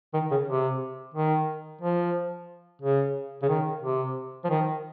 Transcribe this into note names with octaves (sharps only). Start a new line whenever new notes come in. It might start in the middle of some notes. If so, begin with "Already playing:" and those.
D#3
C#3
C3
D#3
F3
C#3
C#3
D#3
C3
F3
D#3